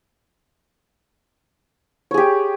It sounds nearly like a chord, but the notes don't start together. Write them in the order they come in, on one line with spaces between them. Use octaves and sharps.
C#5 G#4 G4